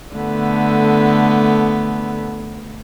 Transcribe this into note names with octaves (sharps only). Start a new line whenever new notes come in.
D3 A3 B3